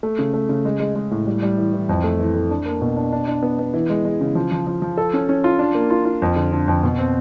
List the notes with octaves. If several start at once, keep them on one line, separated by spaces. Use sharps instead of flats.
A3
C#3
A3
C#3
G#3
G#3
G#3
A2
G3
G3
E3
E3
F2
A3
E3
A3
D4
A#3
B2
D4
D4
D4
B3
B3
E3
G#3
G#3
C#3
F3
F3
F3
F3
A4
C#4
C#4
F4
D4
A#3
F4
F4
F2
D3
D3
F2
B2
C4